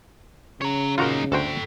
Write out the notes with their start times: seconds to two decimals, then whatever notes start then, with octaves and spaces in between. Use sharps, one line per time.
0.61 C#3 C#5 A#5
0.98 A#2 D#4 F4 F#4 A#4
1.32 D2 F#4 A4 C5 G5